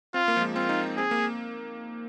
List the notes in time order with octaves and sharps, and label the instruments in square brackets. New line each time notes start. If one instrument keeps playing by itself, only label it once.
[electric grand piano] C4 [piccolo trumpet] F4
[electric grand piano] A#3
F3
G#3
[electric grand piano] C4 [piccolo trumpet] F4
[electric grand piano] D#4
D#4
[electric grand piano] C4 [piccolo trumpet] G#4
[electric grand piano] A#3